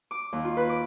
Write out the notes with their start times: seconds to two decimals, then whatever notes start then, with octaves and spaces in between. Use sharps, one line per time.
0.11 D6
0.33 D#2
0.44 F4
0.57 B4
0.69 D6